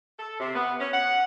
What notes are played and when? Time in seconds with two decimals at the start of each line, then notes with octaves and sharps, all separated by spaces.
0.18 A4
0.40 C3
0.55 B3
0.80 C#4
0.93 F#5